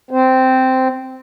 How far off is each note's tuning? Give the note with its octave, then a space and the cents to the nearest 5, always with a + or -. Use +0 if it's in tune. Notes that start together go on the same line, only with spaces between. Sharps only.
C4 -10 C5 -10